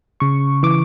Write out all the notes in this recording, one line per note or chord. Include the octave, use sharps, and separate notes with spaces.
C#3 C#6
E3 D6